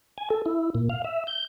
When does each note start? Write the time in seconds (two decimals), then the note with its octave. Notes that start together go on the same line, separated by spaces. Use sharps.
0.18 G#5
0.30 A4
0.46 E4
0.75 A#2
0.90 F5
1.04 E5
1.27 G6